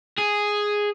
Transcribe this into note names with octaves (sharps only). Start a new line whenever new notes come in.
G#4